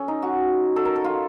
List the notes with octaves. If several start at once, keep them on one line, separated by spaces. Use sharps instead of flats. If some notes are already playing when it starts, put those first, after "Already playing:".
Already playing: C#4 A4
D#4
F#4
A4
A#4
A4
F4